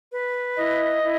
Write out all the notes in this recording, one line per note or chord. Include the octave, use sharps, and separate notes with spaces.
B4
E4 D#5
E4